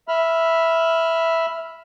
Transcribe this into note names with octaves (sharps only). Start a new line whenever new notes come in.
E5 B5 F6